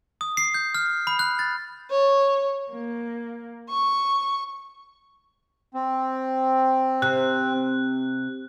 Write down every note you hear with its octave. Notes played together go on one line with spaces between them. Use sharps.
D#6
C7
G6
F6
B5
F#6
A6
C#5
A#3
C#6
C4
C3 F#6